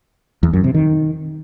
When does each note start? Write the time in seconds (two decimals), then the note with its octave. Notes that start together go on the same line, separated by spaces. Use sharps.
0.43 E2
0.53 F#2
0.64 C3
0.74 D#3